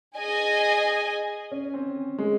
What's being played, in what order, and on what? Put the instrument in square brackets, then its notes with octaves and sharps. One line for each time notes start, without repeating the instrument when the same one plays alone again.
[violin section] G#4 D#5 G#5
[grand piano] C#4
C4
G#3